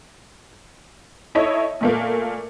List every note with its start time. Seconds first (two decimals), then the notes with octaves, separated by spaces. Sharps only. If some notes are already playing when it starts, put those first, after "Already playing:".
1.35 D#4 E4 A4 C#5 D#5 E5
1.81 A#2 A3 A#3